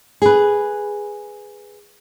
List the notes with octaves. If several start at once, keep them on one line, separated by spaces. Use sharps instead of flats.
G#4 B4